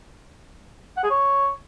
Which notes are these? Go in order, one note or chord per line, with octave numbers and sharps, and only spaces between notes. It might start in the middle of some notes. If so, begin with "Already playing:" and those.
F#5
G#4
C#5